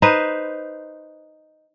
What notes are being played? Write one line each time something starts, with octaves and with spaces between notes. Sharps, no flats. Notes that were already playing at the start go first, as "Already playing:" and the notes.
D#4 B4 C5